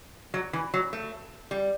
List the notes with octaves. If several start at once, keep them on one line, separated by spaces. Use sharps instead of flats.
F#3
E3
F#3
A3
G3